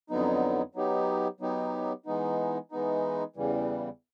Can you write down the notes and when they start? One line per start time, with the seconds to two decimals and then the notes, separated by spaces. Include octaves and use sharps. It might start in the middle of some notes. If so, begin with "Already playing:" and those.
0.10 F2 D3 F#3 B3 D#4
0.75 F#3 B3 D#4 G4
1.40 F#3 B3 D#4 G4
2.06 E3 G#3 B3 D#4
2.71 E3 G#3 B3 D#4
3.36 E2 C#3 E3 G3